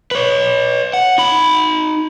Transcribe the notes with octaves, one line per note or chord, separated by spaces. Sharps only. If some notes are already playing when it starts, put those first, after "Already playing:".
B4 C#5
F#5
D#4 B5